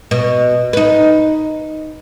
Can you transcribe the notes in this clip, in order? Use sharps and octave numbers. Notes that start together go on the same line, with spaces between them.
B2
D#4 B4